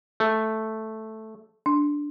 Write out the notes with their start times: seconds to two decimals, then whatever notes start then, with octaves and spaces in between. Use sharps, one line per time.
0.20 A3
1.66 D4